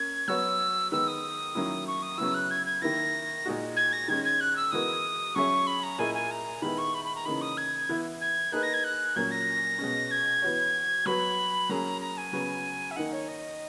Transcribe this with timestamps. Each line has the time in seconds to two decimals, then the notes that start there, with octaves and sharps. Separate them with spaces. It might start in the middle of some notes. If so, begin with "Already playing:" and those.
Already playing: A#3 C#4 G#6
0.28 F#3 B3 F#4 C#5 E6
0.91 D#3 G#3 B3 E6
1.07 D#6
1.55 D#3 F#3 A#3 C#4 E4
1.87 C#6
2.02 D#6
2.18 C#3 F#3 B3 E4 E6
2.34 F#6
2.50 G#6
2.66 G#6
2.82 D#3 A#3 E4 A#6
3.46 A#2 G#3 D#4 F#4
3.76 G#6
3.93 A#6
4.08 D#3 G#3 C#4 G#6
4.24 G#6
4.40 F#6
4.56 E6
4.71 E3 G#3 B3 F#4 A#4 D#6
5.35 F#3 C#4 G#4 C#5 E5 C#6
5.67 B5
5.83 A#5
5.98 A#2 A#3 E4 G#4 D#5 G#5
6.14 G#5
6.31 A#5
6.62 D#3 G#3 B3 E4 B5
6.78 C#6
6.94 B5
7.04 B5
7.15 A#5
7.25 C#3 E3 A#3 D#4 B5
7.41 D#6
7.57 G#6
7.89 E3 B3 E4 B4
8.21 G#6
8.52 A#3 D#4 G#4 B4 F#6
8.63 A#6
8.73 G#6
8.84 F#6
9.16 A#2 F#3 A#3 C#4 G#6
9.31 A#6
9.79 B2 G#3 C#4
10.11 G#6
10.42 E3 B3 F#4 C#5
11.06 F#3 B3 F#4 B4 B5
11.69 F#3 A#3 C#4 G#4 A#5
12.01 A#5
12.17 G#5
12.33 C#3 F#3 B3 F#4
12.91 E5
12.96 D#3 A#3 D#4 F#5
13.12 C#5
13.28 D#5